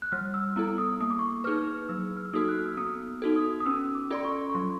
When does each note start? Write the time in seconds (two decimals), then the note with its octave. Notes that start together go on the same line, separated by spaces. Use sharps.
0.02 F#6
0.12 G3 F6
0.34 E6
0.56 B3 E4 A4
0.78 D#6
1.00 A#3 D#6
1.10 D6
1.19 C#6
1.29 D6
1.44 D#4 G#4 B4 F6
1.89 F#3 E6
2.17 F6
2.25 E6
2.33 A#3 D#4 F#4 A4 D#6
2.49 F#6
2.59 F6
2.68 E6
2.77 B3 D#6
3.22 D#4 F#4 A4
3.36 D#6
3.60 D#6
3.66 C#4 E6
3.95 D6
4.10 F4 A4 D5 C6
4.25 C#6
4.50 C#6
4.55 F#3 C6